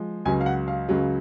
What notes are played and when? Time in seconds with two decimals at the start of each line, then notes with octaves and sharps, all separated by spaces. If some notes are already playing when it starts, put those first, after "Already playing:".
Already playing: F3 G#3
0.25 C#2 C#3 F#3 G#5
0.41 F5
0.46 F#5
0.68 F5
0.89 C#2 C#3 F#3